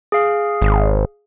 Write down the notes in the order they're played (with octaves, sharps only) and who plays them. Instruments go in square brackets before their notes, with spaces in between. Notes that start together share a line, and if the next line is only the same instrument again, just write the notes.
[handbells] G#4 F5
[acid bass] G#1